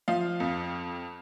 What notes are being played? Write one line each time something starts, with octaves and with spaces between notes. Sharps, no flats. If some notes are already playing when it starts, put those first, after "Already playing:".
F3 F5
F2